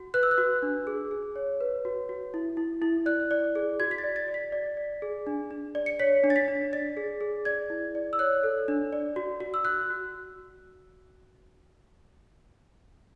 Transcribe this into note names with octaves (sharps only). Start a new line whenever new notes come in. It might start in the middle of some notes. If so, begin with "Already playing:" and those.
Already playing: F#4
B4 F#6
E6
F#6
F#4
D4
G#4
G#4
C#5
B4
F#4
F#4
E4
E4
E4
D5 F#6
D5
G#4
F#4 G#6
B6
A6
D5
A6
D5
B6
D5
D5
G#4
D4
D4
D5
C#7
C#5 B6
D4
A6
B6
D4
D5 A6
G#4
G#4
D5 G#6
E4
D5
E6
C#5 F#6
A4
D4
D5
F#4
F#4
E6
F#4 F#6
F#4